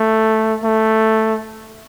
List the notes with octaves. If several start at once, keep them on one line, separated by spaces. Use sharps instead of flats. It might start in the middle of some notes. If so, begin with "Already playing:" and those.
Already playing: A3
A3